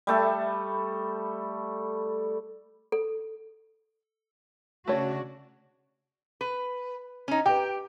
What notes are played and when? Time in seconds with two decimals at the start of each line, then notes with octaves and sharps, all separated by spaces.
0.07 G3 A3 A4
2.92 A4
4.88 C#3 A3 D4 F#4 C#5
6.41 B4
7.28 C#4 D#4
7.46 G4 B4 G5